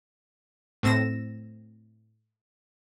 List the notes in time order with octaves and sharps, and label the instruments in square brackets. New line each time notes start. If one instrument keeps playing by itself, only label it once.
[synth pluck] A2 C4 E6 A#6 E7